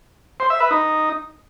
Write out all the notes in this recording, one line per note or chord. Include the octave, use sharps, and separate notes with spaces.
C5
E5
B4
D#4